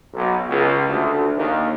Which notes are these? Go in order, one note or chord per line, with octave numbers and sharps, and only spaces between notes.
B1
C#2
D2
D#2